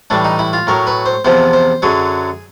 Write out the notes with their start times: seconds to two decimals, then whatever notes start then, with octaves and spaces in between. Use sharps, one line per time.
0.10 A2 E3 G3 D4
0.25 D#4
0.39 E4
0.53 F4
0.67 A2 F#3 A#4
0.87 B4
1.06 C5
1.24 E2 C3 F3 C5
1.53 C5
1.82 F#2 D3 F#3 G#4